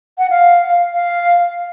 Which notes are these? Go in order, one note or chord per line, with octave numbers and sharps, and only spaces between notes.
F#5
F5
F5